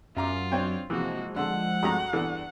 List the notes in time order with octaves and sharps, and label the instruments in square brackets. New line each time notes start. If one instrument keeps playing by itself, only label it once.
[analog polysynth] F#2 [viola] F4 [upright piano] E5 A#5 D6
[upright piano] C4 D4 [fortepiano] C5 C#5 G5
[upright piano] C3 [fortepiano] E3 [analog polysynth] F3 G#3 [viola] A#3 F#4
[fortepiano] D3 [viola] F#5 [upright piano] A5 C6 E6
[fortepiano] G2 A3 A#5 [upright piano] F#4 D#6
[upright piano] E2 G2 A4 [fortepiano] E3 B3 F#6